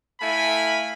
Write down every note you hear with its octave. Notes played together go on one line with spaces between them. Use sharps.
A3 E4 F5 G#5 B5